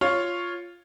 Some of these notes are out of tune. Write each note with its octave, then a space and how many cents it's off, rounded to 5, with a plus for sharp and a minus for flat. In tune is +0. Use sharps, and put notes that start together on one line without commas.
F4 +0 C#5 +0